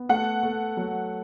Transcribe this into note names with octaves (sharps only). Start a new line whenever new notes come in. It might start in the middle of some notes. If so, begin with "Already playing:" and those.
Already playing: B3
A3 F#5
A3
F#3